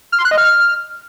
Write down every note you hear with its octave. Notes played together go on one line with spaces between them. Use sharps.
F6
C6
F#6
D#5
F6